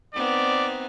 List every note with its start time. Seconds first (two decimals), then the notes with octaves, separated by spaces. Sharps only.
0.14 B3 C4 D#4 D5